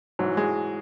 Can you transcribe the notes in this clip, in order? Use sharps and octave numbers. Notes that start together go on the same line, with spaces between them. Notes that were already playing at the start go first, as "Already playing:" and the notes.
G#2 E3 F#3
G#3